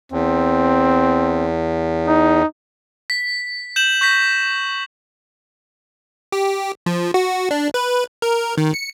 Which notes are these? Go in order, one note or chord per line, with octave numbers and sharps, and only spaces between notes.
E2 C4
D#4
B6
G6 E7 F#7
C#6 G6 A#6 B6
G4
F3
F#4
D4
B4
A#4
D#3
C#7